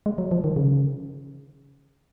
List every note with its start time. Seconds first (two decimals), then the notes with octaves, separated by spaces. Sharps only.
0.06 G#3
0.18 F#3
0.31 F3
0.44 D#3
0.56 C#3